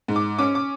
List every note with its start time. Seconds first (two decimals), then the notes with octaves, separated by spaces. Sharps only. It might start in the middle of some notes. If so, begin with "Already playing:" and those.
0.08 G#2
0.16 D6
0.39 C#4 D6
0.55 D6